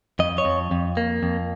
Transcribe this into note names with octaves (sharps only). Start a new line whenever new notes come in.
F2 D#5
C#5
F2
F2
A#3
F2